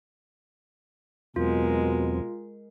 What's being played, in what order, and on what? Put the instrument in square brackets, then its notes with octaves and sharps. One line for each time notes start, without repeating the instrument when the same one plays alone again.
[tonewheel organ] E2 F#3 C4 [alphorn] B2 [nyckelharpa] G#3 A#4 [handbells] F4